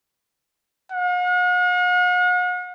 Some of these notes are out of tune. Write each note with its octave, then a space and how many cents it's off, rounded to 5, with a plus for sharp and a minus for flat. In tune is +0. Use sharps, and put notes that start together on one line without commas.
F#5 -45